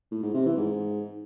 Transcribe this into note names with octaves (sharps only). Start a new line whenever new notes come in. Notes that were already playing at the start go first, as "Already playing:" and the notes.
A2
G#2
C3
E3
G#2